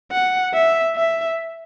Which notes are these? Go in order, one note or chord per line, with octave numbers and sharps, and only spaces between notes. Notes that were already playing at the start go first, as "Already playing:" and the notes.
F#5
E5
E5